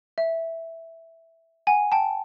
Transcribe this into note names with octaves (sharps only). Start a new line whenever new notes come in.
E5
F#5 G#5
G5 A5